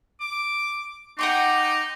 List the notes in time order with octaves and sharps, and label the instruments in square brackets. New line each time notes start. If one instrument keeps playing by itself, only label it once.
[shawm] D6
[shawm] D#4 [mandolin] F#5 G5 C6 [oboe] D6